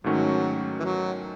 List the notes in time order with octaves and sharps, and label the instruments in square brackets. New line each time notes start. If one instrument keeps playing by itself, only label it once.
[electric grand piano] G#2 D#3 A3 C#4 F#4 [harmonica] F#3
[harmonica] E3
F#3